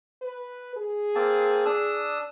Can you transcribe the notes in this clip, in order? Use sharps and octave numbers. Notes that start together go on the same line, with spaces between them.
B4
G#4
A#3 C4 A5
D4 D#6 E6